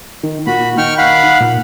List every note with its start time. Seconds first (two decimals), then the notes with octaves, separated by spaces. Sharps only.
0.23 D#3
0.47 A#2 F#4 B5
0.78 D#3 G5 C#6 F6
0.98 F5 F#5 B5
1.40 A#2